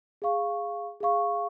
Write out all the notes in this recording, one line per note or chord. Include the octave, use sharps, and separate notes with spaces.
G#4 F5 C#6
G#4 F5 C#6